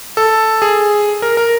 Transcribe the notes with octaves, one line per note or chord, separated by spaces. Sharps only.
A4
G#4
A#4
A#4